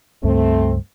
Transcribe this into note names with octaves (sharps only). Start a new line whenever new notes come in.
C#2 G2 A3 C4